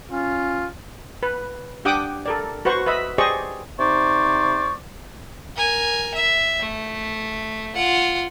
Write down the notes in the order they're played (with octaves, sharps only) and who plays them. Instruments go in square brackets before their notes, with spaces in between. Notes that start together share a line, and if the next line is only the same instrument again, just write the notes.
[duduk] C#4 [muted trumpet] F4
[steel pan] B4
D4 G4 F#5 G5 D6 D#6
A4 A#4 D5
F#4 B4 C5 F#5 C#6
B4 D#5 E5 B5
G4 G#4 C5 D5 D#5 C#6
[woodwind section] C3 D#4 C5 D5 C#6
[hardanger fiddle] A#4 G#5
E5
A3
F4 F#5